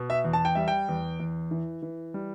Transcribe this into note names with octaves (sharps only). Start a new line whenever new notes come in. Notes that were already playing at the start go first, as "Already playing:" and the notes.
Already playing: B2
E5
E2
A5
G5
G3 E5
G5
E2
E2
E3
E3
G3